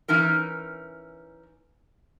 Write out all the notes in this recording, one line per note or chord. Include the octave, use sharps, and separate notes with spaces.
E3 C#4 D#4 A#4